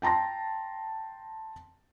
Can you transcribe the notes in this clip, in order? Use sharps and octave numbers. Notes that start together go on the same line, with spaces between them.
G5 A5 A#5 C6 A#6